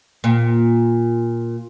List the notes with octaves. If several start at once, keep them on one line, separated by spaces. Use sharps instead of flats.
A#2